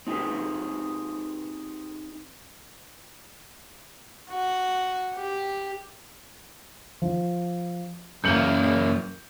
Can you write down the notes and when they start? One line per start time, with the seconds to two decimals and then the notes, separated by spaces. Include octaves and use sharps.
0.07 C4 D#4 G4 G#4 B4
4.29 F#4
5.14 G4
7.02 F3
8.24 F#2 E3 A#3 G6 C#7 F#7